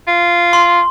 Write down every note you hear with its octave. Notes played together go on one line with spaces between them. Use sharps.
F4
C6